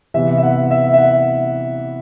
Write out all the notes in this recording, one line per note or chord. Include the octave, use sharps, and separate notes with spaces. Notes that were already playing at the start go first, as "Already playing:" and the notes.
C3 E3 B3 E5
E5
F#5
E5
E5
F#5